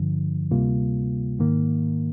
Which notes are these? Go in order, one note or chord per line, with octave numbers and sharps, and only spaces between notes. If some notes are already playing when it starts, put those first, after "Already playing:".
Already playing: G2 D3 F3
D2 C3 G3 A#3 F4
G#2 D#3 A#3